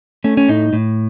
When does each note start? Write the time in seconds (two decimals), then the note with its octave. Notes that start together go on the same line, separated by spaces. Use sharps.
0.24 A3 C#4
0.37 C#4
0.49 A2 D#4
0.73 A2